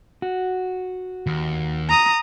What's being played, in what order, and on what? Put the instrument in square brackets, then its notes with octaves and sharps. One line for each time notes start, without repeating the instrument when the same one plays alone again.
[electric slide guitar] F#4
[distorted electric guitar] D#2
[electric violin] A#5 D#6